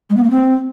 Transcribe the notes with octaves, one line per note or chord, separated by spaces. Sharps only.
G#3
B3
A#3
C4